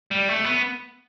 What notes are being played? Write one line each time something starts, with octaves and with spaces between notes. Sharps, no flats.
G3
A3
B3